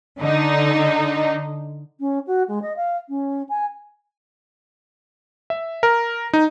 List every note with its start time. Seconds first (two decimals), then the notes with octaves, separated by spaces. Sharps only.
0.19 D3 D#4
2.00 C#4
2.27 F#4
2.48 G#3
2.62 D#5
2.76 F5
3.09 C#4
3.49 G#5
5.50 E5
5.83 A#4
6.33 D#4